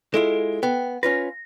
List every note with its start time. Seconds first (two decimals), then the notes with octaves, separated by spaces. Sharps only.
0.14 G#3 E4 F4 A4
0.63 B3 G5
1.03 C#4 F4 B4 A#6